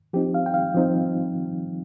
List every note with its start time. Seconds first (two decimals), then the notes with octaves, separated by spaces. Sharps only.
0.13 F3 C4 D#4 G4
0.34 F5
0.46 G5
0.54 F5
0.74 F3 C4 D#4